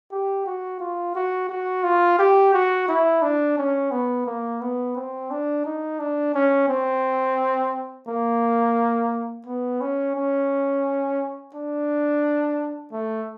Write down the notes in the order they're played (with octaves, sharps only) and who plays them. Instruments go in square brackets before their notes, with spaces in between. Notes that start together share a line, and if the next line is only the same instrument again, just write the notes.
[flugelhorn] G4
F#4
F4
F#4
F#4
F4
G4
F#4
E4
D4
C#4
B3
A#3
B3
C4
D4
D#4
D4
C#4
C4
A#3
B3
C#4
C#4
D4
A3